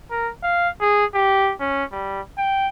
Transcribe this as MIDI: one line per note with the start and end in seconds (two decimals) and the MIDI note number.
0.11 0.31 70
0.43 0.69 77
0.81 1.05 68
1.14 1.53 67
1.60 1.84 61
1.92 2.21 55
2.38 2.67 79